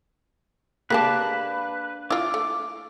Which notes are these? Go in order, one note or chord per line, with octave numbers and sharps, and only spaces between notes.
G#3 A#3 D4 G4 B4 A5
E4 F4 D6
A3